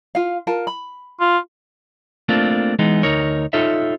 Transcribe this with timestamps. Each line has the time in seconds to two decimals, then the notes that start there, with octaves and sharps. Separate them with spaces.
0.15 F4 F5
0.47 F4 A#4 A5
0.67 B5
1.21 F4
2.29 A3 A#3 C4 D4 F4
2.79 E3 G#3 B3 D#4
3.03 D2 D#4 A#4 C#5
3.53 D#4 F4 A4 C#5 E5